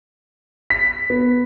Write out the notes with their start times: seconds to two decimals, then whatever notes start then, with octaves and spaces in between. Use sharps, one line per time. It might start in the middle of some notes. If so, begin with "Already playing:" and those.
0.70 B6
1.10 B3